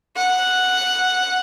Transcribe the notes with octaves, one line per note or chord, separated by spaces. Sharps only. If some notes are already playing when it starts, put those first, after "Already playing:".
F#5